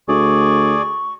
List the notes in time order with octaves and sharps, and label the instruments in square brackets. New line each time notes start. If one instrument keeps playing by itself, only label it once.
[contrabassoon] D2 [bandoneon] G#4 D5 [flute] C#6